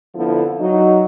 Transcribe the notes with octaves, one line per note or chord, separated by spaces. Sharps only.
F2 D3 F3 B3 E4 A4
F#3 D#4